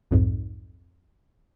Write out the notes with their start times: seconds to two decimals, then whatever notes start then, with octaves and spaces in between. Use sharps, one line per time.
0.11 B1 F2 G#2